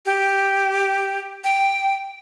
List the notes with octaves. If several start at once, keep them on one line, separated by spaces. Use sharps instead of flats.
G4
G5